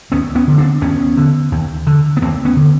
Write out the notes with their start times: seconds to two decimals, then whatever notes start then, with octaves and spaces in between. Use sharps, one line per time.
0.12 D#2 B3 C#4
0.35 B3 C#4
0.47 D3
0.58 C4 D4
0.82 D#2 B3 C#4
1.17 D3
1.52 D#2
1.87 D3
2.17 B3
2.22 D#2 A#3 C4
2.45 B3 C#4
2.56 D3